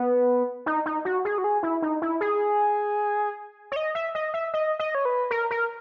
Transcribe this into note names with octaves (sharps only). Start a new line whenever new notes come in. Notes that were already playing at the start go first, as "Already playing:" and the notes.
Already playing: B3
D#4
D#4
F#4
G#4
F#4
G#4
E4
D#4
E4
G#4
C#5
D#5
E5
D#5
E5
D#5
D#5
C#5
B4
A#4
A#4